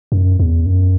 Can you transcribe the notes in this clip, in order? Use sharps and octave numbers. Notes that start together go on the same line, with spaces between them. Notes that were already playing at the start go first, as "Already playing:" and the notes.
F#2
E2
F#2